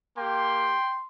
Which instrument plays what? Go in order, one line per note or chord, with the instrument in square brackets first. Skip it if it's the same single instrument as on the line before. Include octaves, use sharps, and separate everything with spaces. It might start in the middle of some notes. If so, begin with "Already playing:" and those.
[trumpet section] A#3 G4 G5 C6